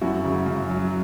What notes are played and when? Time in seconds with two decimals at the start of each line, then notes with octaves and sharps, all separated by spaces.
0.01 F#2 E4 F#4
0.24 C#3
0.46 F#2
0.70 F#3